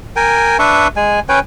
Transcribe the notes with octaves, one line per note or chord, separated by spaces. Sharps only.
A#4 G5 G#5
D4 B4 E5 C#6
G#3 G#5
C#4 B4 C#5 G5